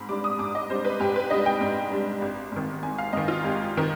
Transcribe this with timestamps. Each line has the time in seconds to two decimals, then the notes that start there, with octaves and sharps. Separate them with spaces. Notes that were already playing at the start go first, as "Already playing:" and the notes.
Already playing: G#2 B5
0.09 G3 D4 D6
0.24 D#6
0.39 G#2 D6
0.55 D#5
0.70 G3 D4 C5
0.85 B4
1.00 G#2 G4
1.16 B4
1.30 D4 D#5
1.33 G3
1.46 G5
1.61 G#2
1.92 G3 D4
2.22 G#1
2.52 G#2 D#3
2.83 G#1 G#5
2.98 F5
3.13 G#2 D#3 D#5
3.28 F4
3.44 G#1 G4
3.77 D#3